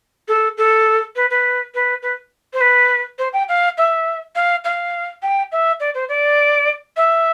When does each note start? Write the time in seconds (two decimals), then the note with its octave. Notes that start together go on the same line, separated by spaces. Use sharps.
0.28 A4
0.57 A4
1.16 B4
1.30 B4
1.74 B4
2.02 B4
2.53 C5
2.61 B4
3.18 C5
3.33 G5
3.49 F5
3.78 E5
4.35 F5
4.64 F5
5.22 G5
5.52 E5
5.80 D5
5.94 C5
6.09 D5
6.97 E5